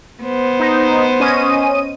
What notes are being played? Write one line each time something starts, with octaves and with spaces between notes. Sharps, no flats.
B3 C5
D#4
C#4 D#5 D#7